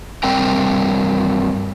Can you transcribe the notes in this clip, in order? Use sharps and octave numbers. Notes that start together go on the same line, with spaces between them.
G2 G3 C4 A#4 G5